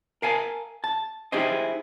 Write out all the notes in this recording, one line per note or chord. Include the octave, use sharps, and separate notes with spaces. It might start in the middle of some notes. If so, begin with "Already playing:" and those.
A#4 F5 G#5 A5
A5
D#4 E4 G4 G#4 C5 D#5